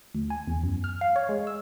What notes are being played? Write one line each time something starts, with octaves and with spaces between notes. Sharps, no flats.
D2
G#5
E2
F#2
F6
F5
C#5
G#3
E6